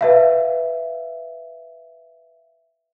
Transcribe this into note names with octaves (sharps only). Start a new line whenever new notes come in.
B4 E5 F5